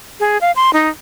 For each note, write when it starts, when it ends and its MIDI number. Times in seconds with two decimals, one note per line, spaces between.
0.20 0.38 68
0.41 0.52 77
0.56 0.70 84
0.73 0.89 63